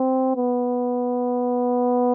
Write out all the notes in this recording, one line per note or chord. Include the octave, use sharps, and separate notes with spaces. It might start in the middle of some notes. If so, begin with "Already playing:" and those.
Already playing: C4
B3